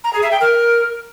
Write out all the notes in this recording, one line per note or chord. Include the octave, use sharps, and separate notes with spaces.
A#5
G#4
E5
G5
A#4